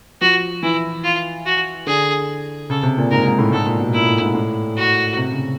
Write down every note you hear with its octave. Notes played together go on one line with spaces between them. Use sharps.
F3 F#4
E3 E4
F4
F#4
D3 G#4
C#3 A4
C3
A#2
G#2 A#4
G#2
A2
G#2 A4
A#2
B2
A#2 E4
A2
G#2
A2
F#4
C3
C#3